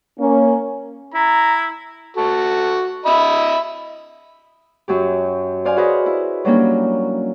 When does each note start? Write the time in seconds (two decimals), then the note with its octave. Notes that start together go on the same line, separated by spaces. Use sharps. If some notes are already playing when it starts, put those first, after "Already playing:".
0.19 A#3 C#4
1.14 E4 A#5
2.16 F#4 A4
3.06 D#5 E5 B5
4.88 F#2 F#3 G4
5.65 C5 D5 F5 G#5
5.76 F#4 G#4 B4 C5 D#5 F5
6.06 E4
6.45 F#3 G3 A#3 C#4 D4